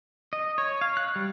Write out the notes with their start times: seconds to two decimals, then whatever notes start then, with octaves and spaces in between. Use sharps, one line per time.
0.33 D#5
0.58 C#5
0.81 F5
0.97 F#6
1.16 G3